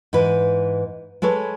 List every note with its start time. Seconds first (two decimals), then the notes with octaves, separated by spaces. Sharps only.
0.13 G#2 E3 B4
1.22 G#3 A4 B4 C#5